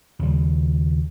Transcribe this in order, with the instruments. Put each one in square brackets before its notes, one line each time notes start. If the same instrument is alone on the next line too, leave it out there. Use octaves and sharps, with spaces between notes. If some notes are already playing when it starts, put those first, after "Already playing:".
[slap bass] D#2 C#3 G3